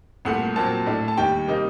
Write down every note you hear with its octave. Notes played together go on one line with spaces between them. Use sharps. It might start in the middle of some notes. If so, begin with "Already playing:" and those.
C2 A#2 A3 F#5
A#2 F#3 C4 A5
A2 A3 D4
A5
D#2 D#3 G3 G5
C3 G3 A#3 D#4